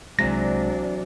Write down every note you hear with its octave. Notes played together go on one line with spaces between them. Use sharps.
C2 C3 E3 F#3 G#3 D4 D5 A#6